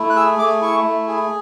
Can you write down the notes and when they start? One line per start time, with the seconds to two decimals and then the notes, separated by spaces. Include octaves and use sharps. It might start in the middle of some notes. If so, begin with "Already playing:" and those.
Already playing: A3 E4
0.10 F#6
0.16 G#4 E6
0.39 A3 D6
0.61 E4 C#6
0.85 A3
1.08 G#4